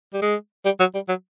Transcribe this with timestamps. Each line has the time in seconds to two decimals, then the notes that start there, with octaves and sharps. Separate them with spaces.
0.13 G3
0.22 G#3
0.65 G3
0.80 F#3
0.94 G3
1.09 F#3